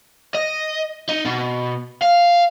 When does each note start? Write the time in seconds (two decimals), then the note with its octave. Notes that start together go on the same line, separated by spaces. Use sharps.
0.35 D#5
1.09 D#4
1.25 B2
2.02 F5